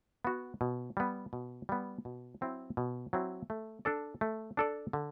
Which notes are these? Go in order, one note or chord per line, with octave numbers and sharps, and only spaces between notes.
B3 F#4
B2
G3 B3
B2
G3 B3
B2
F#3 C4 E4
B2
F#3 C4 E4
A3
D4 A4 D5
A3
D4 A4 D5
D3